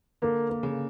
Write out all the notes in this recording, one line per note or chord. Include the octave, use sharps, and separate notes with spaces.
D3 A#3
A#3
C#3